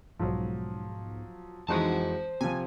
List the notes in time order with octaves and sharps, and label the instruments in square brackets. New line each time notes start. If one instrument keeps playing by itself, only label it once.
[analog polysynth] B1 G#2 [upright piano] F3 F#3
[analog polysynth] F2 D#4 F#4 [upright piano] E3 G#3 C4 [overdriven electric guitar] C5 A5
[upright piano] C3 F3 [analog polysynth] G#5